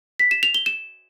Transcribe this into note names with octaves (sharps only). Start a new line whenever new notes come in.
B6
E7
F7
G7
E7